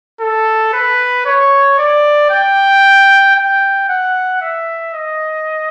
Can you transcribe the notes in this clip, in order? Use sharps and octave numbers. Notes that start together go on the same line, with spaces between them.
A4
B4
C#5
D5
G5
G5
F#5
E5
D#5